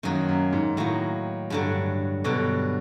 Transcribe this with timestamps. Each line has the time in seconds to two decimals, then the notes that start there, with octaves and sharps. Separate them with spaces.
0.03 F#2 D#3 F#3 A#3
0.28 F#2
0.53 G#2
0.77 A2 D#3 F#3 A#3
1.50 G2 D3 F#3
2.24 G2 B2 D3 F#3